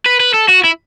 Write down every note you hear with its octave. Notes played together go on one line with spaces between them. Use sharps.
B4
B4
A4
F#4
E4